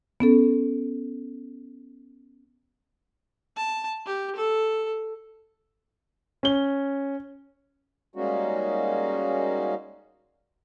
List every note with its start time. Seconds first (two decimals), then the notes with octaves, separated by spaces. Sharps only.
0.20 B3 C#4 A4
3.57 A5
4.06 G4
4.36 A4
6.43 C#4 G7
8.16 G3 G#3 A#3 C#4 D#4 F#4